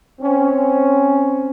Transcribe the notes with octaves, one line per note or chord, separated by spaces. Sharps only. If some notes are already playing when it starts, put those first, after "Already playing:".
C4 C#4